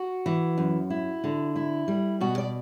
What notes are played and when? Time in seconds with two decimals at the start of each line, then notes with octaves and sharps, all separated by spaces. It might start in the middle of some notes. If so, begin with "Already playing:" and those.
Already playing: F#4
0.26 E3
0.58 F#2
0.90 E4
1.24 D3
1.56 E4
1.88 G3
2.21 B2 F#4
2.38 D5